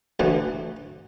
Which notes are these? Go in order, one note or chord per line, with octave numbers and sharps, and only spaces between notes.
D2 B2 E3